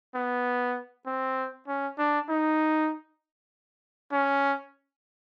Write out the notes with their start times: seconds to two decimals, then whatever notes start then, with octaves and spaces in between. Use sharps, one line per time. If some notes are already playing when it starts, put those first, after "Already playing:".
0.15 B3
1.06 C4
1.68 C#4
1.98 D4
2.29 D#4
4.12 C#4